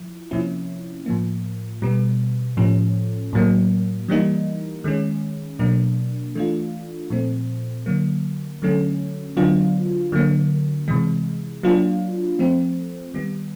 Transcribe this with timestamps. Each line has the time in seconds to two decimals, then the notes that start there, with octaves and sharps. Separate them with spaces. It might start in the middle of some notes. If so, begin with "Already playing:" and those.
Already playing: F3 E4
0.31 C3 F3 A#3 C#4 E4
1.06 A2 F3 A#3
1.82 B2 G3 B3
2.57 A2 F3 A3 C#4
3.33 A2 F#3 A#3
4.08 E3 G3 A#3 D#4
4.84 D#3 G#3 C#4
5.59 B2 F#3 A#3 D4
6.35 E3 A3 D4 F4
7.10 A#2 F3 A3 C4
7.86 D3 F#3 A#3
8.62 D3 F#3 A3 C#4
9.37 D3 F#3 B3 D4 F4
10.12 D3 F#3 A#3
10.88 C3 E3 G#3
11.63 F#3 A#3 D4 F4
12.39 F3 A3 C4
13.14 D#3 G3 B3